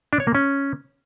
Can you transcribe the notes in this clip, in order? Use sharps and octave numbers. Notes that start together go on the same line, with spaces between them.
D4
C#5
A#3
C#4